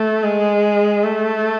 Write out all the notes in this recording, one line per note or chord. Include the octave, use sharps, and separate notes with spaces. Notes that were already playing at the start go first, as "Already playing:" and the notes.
Already playing: A3
G#3
A3